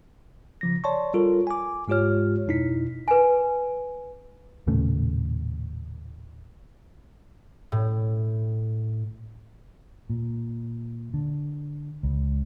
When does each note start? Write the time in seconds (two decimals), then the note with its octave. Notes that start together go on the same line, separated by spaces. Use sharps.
0.61 C#3 F3 A#6
0.84 C#5 D5 A5 C6 C#6
1.14 G3 F4 A4 A#4
1.47 G#5 D6
1.88 G#2 G#3 F4 G4 C#5 F6
2.47 F2 B2 D#4 E4 B6
3.08 B4 G#5
4.67 D#1 A2 C#3 A3
7.72 A2
10.10 A#2
11.14 D3
12.03 C#2